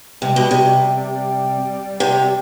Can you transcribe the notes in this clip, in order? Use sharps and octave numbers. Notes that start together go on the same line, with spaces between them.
C3 G3
B2
C3
C3